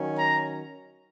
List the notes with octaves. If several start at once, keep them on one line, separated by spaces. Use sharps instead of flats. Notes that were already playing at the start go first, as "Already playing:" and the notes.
Already playing: D#3 F#3 C#4
A#5